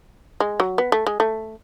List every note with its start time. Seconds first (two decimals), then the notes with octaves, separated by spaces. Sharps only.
0.40 G#3
0.60 F#3
0.78 B3
0.92 A3
1.07 G#3
1.20 A3